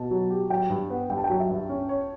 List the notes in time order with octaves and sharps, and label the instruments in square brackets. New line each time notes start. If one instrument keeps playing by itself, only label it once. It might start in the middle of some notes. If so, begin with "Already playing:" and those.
Already playing: [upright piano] B2 [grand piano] A5
[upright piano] F#3
G4
[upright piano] F#3 [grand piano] G5
[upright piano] G2
B3
[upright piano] G2 [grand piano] G5
[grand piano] A5
G5
[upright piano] F#3
[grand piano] E5
[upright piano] G2
C#4
C#5